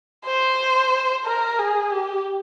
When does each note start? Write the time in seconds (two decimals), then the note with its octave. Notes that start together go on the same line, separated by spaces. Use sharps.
0.25 C5
1.26 A#4
1.59 G#4
1.92 G4